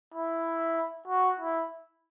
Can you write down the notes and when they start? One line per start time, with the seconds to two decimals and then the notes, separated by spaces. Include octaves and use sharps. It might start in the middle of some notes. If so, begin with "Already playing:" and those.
0.14 E4
1.08 F#4
1.40 E4